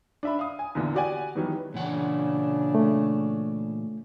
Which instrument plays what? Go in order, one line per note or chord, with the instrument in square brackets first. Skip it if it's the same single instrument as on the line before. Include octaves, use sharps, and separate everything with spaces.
[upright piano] D4 E5 B5
F5 D#6
G#5
E2 A#2 D3 E3
F#4 G4 D5 F#5 G#5
D#3 E3 F#3 G3 B3
[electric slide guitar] A#2 E3 F#5 [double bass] C#3 D4
[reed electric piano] A3